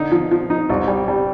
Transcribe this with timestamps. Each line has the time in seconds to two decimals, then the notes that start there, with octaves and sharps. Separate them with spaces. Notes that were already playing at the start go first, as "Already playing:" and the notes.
Already playing: D3 D#4
0.12 F3
0.31 F3
0.50 D#4
0.70 C2
0.88 G3
1.08 G3